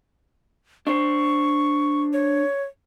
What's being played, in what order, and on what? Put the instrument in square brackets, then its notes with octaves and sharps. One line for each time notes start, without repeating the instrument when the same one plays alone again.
[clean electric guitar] D4 C5 [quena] C#6
[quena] C#5